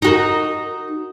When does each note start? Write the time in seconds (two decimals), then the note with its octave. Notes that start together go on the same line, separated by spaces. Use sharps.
0.02 D#4 F#4 A#4